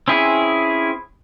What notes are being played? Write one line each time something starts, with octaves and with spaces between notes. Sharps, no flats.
C4 C#4 E4 G#4